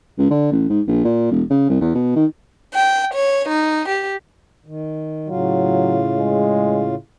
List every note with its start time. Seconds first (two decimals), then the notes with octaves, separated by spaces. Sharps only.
0.19 C#2
0.31 D3
0.52 A1
0.70 G#2
0.87 A#1
1.05 A#2
1.31 E1
1.50 C#3
1.70 C2
1.81 E2
1.95 B2
2.16 D#3
2.75 G5
3.14 C#5
3.49 D#4
3.89 G4
4.66 D#3
5.29 A2 C#3 F#3 F4
6.18 G#3